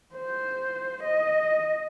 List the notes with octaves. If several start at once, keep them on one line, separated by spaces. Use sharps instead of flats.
C5
D#5